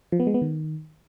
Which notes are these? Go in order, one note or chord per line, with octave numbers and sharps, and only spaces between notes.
F3
B3
G#3
B3
D#3